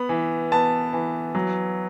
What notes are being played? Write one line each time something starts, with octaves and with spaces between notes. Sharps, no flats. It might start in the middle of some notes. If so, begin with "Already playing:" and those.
Already playing: B3 B5
E3
B3 A5
E3
F#3